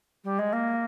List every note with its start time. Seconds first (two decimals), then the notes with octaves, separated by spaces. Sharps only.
0.24 G3
0.38 G#3
0.52 A#3